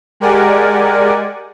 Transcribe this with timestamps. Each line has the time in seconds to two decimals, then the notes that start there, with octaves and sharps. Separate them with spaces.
0.20 G#3 G4 A#4 D5 F#5 G#5